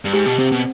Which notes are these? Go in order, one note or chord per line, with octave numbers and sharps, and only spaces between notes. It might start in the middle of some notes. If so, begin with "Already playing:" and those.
G2
G#2 G4
B2
C3 C4
B2